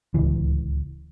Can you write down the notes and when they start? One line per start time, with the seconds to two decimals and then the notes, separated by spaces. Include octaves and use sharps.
0.14 D1 G#1 C#2 E3